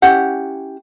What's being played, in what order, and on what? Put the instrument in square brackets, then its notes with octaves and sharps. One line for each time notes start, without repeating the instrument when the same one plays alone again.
[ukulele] C#4 E4 G4 F#5